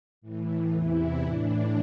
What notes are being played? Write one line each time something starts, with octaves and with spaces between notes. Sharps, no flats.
A2 E3
E2 C3 E3 E4
A2 E3 D4